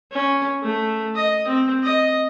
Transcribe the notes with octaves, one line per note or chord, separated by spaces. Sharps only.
C#4
A3
D#5
C4
D#5